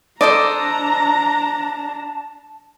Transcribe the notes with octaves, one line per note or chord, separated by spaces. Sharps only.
D4 A4 C5 D5 D#5 A5 A#5